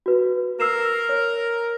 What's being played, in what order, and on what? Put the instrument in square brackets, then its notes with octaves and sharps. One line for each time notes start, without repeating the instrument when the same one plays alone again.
[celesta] F#4 B4
[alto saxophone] A#4 [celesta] E6 C7 E7
[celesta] C#5